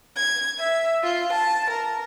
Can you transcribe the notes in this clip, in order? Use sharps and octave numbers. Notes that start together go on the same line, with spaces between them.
G#6
E5
F4
A5
A#4